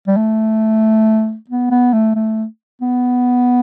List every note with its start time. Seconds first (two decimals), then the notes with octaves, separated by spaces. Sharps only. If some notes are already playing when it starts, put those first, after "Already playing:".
0.07 G3
0.17 A3
1.49 B3
1.71 B3
1.93 A3
2.15 A3
2.81 B3